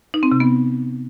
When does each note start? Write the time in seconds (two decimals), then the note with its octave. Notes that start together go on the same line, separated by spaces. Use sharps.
0.14 D#4
0.23 C4
0.32 C3
0.40 B3